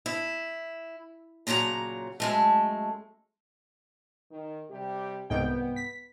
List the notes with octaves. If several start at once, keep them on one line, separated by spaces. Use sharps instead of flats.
E4
A#2 C#3 F#3 C#5 A#5
F#2 G#3 A3
D#3
C3 G3 G4
C2 G#2 B3 G5
B6